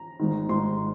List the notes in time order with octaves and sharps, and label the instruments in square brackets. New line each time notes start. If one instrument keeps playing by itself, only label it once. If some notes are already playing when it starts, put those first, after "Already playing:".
Already playing: [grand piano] A#5
G#1 G#2 D#3
G#1 G#2 D#3 C6